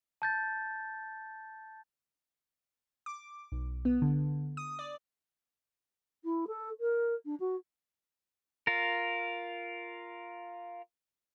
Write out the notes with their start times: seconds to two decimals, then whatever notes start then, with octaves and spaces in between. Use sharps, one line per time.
0.22 A5 G6 A6
3.06 D6
3.52 B1
3.85 B3
4.02 D3
4.57 D#6
4.79 D5
6.24 E4
6.47 A4
6.80 A#4
7.25 D4
7.39 F#4
8.67 F4 A#4